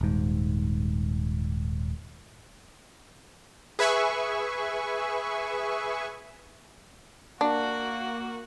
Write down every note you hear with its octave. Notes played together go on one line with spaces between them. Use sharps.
D#1 G#2
G#4 B4 E5 G#5 C#6
A#3 D4 F#4